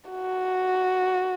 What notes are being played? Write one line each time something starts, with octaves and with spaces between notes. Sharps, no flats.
F#4